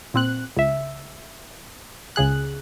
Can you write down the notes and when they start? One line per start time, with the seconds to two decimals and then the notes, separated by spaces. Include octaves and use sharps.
0.14 A#2 C4 F#6
0.57 C#2 E5
2.16 C#2 C#3 G#4 F#6